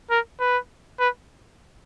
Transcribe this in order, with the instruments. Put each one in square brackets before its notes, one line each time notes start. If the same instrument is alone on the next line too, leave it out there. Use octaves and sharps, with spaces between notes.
[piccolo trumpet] A#4
B4
B4